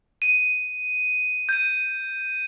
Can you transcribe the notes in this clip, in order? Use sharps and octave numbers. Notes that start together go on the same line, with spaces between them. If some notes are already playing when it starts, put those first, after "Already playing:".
D#7
G6 D#7